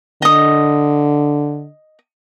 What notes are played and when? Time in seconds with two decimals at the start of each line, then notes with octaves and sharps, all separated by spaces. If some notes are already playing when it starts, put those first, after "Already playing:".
0.22 D3 D#5 D#6